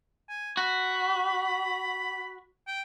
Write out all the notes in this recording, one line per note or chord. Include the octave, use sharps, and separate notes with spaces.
G#5
F#4 B5
G5